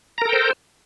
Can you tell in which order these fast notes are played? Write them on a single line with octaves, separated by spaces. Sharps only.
A#5 A#4 A4 G5 C5